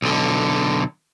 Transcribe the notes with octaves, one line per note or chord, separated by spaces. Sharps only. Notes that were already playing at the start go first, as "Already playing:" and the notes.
B1 D3